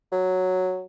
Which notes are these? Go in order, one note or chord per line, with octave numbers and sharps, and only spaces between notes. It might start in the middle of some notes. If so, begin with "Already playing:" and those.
F#3